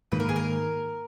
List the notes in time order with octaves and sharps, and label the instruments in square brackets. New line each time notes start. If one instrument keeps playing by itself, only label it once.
[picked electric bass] G#2 D#3 A#3 [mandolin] B4
[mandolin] A#4
G#4
A#4